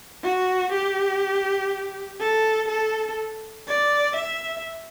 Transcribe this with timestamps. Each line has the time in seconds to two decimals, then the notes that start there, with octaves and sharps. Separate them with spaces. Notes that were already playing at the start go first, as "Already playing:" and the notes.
0.23 F#4
0.73 G4
2.21 A4
2.69 A4
3.67 D5
4.16 E5